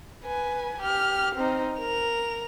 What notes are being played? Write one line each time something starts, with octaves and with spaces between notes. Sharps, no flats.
B4 G#5
G4 F6
C4 D#4
A#4 F7